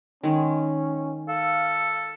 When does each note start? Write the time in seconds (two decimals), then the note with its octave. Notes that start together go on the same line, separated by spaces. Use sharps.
0.23 D#3 G#3 C#4
1.28 A4 F5